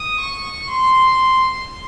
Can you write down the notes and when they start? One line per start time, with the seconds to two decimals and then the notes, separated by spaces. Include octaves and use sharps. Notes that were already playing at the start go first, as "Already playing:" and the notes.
Already playing: D#6
0.21 C#6
0.73 C6